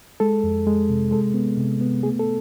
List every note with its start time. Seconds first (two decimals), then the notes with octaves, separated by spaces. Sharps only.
0.20 G#3 A4
0.44 F2
0.67 G#3
0.89 C3
1.11 G#3 A4
1.34 B3
1.58 C3
1.81 B3
2.03 A3 G#4
2.19 A4